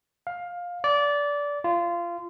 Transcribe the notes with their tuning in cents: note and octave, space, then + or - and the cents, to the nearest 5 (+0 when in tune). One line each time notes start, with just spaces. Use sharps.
F5 +15
D5 -20
F4 -20